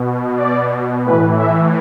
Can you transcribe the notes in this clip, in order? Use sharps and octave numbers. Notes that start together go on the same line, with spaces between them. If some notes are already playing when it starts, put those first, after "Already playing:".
Already playing: B2
D5
A2 E3 B4
E5